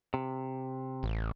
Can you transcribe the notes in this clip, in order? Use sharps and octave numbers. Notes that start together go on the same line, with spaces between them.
C3
A1